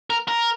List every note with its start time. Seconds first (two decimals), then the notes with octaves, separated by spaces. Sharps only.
0.10 A#4
0.28 A#4